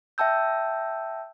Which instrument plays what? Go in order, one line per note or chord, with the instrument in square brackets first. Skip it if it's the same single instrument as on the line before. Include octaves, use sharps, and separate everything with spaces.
[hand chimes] E5 G5 A5 E6 G6